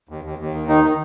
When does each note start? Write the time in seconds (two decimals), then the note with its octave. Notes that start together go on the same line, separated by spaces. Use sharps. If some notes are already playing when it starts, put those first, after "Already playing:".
0.09 D#2
0.24 D#2
0.39 D#2
0.54 D#3
0.68 D#3 D#4
0.84 D#3